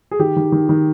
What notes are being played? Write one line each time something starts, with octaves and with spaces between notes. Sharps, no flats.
G#4
D#3 G4
D#3
D#3
D#3